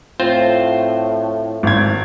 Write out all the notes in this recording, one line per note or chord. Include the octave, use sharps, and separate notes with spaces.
A2 C4 F4 C5
G#1 G#6